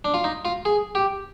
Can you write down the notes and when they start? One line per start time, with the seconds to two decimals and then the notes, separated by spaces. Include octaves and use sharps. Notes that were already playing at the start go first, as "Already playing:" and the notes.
0.05 D4
0.14 F4
0.24 D#4
0.45 F4
0.65 G#4
0.95 G4